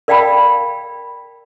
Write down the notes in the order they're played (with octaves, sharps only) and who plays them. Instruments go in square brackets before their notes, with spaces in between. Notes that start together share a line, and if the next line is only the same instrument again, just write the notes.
[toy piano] A#4 D5 F5 G5 A5 B5